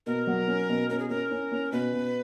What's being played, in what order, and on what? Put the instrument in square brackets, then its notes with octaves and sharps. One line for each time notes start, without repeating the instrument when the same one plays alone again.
[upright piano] B2 [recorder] A#4
[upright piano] F#3
C#4
B2
[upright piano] C#4 [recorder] A#4
[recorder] G#4
[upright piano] C#4 [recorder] A#4
[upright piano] C#4
C#4
[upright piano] B2 [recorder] B4
[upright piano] B2